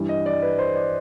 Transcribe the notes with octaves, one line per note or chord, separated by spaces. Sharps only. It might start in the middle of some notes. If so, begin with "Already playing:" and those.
Already playing: G2 E3 G3
D#5
D5
B4
C5
D5